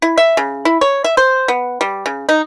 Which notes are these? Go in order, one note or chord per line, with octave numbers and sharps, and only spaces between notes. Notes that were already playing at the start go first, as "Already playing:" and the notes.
E4
E5
C#3
E4
C#5
E5
C5
B3
G3
C#3
D#4